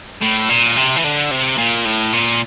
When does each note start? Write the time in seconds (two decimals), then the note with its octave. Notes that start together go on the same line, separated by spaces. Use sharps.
0.21 A2
0.49 A#2
0.77 C3
0.96 E3
1.04 D3
1.31 C3
1.58 A#2
1.85 A2
2.13 A#2